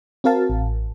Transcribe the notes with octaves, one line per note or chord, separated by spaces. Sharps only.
C4 F#4 A#4 F5 A5
A1